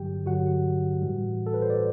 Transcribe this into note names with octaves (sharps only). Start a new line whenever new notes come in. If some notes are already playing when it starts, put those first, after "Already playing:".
Already playing: G2 D3 F#3 G4 G5
G2 D3 F#3 F#4 F#5
A2 E3 G3
A4
B4
C5
D5